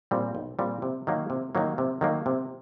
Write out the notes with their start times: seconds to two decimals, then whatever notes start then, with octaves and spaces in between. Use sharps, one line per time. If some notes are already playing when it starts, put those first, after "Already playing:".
0.11 A#2 G3 C4
0.35 B1
0.59 A#2 G3 C4
0.82 C3
1.07 D#3 F#3 A#3
1.30 C3
1.55 D#3 F#3 A#3
1.78 C3
2.01 D#3 F#3 A#3
2.26 C3